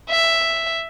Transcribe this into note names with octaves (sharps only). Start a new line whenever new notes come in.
E5